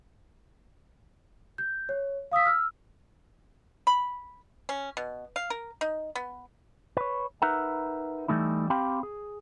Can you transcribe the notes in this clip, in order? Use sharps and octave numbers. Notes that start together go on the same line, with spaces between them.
G6
C#5
F5 D#6 E6 B6
E6 F6
B5
C#4
B2
F5
A#4
D#4
B3
B4 C#5
D#4 A#4 B4 E5 F#5 A#5
E3 G3 A3 D#4 E4
C4 G4 F5 G5 B5 C6
G#4